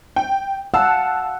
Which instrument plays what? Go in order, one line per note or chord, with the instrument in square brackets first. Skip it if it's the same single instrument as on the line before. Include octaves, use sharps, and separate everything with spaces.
[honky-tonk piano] G5
[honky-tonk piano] F5 A5 E6 [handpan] F#5